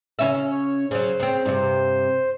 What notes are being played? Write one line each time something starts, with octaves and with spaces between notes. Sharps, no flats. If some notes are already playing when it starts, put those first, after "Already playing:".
C#3 C#4 E5
C#5
C#3 F#3 C5
C#3 C4
G2 C3